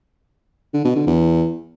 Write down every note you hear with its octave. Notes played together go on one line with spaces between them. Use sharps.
D3
B2
D3
E2